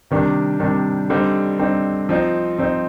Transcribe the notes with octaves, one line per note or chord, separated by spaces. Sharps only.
C3 D#3 G3 D4
C3 D#3 G3 D4
D3 G3 C4 D#4
D3 G3 C4 D#4
F3 C4 D#4
F3 C4 D#4